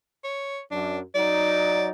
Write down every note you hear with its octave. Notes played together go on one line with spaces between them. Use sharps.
C#5
F#2 D4
F#3 D#4 D5